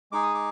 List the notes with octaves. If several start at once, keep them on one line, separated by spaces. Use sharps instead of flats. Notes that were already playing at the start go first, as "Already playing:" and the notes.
G#3 D#4 G#4 D6
D#6
D6